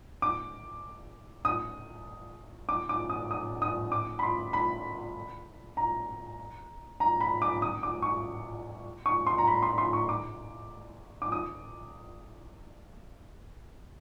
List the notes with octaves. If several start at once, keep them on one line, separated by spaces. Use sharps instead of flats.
D6
D#6
D6
D6
D#6
D#6
D#6
D6
B5
C6
B5
A#5
A#5
B5
D6
D#6
D6
C#6
C#6
C6
A#5
B5
C6
C6
C#6
D6
D6
D#6